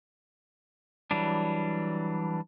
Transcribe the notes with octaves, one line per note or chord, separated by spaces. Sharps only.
E3 F#3 G3 D4